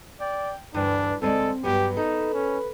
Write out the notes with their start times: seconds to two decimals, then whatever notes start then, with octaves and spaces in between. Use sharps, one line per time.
0.20 D5 G5
0.74 D2 G2 E3 D4 B4
1.22 D2 G#3 C4 A4 D5
1.64 G2 F#3 B3 G4 B4
1.97 D#4 A4
2.34 C#4